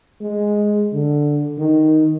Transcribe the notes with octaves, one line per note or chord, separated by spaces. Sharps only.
G#3
D3
D#3